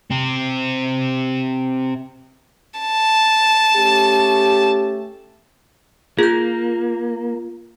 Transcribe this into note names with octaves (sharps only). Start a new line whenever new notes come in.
C4 G4
A5
A3 C#4 G4
A#3 F4 G#4 G6